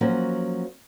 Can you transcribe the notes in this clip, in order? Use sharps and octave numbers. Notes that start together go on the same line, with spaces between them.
F3 F#3 A#3 C#4 F#4